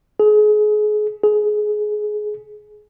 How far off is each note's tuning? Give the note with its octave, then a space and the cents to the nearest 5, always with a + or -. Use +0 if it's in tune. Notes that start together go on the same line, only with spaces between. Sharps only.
G#4 +30
G#4 +20